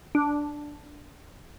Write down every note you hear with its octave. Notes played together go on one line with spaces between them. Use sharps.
D4